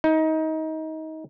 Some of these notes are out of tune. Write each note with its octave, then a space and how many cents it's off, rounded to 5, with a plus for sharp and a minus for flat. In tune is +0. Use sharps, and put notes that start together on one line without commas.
D#4 +25